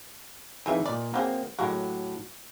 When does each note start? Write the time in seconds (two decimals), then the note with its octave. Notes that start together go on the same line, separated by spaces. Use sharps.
0.66 F2 E3 C4 D#4 G#4 E5
0.86 A#2 D5 D#5
1.14 F#3 A#3 C4 G4 G#4
1.59 A2 F#3 G#3 A#3 F#4 G4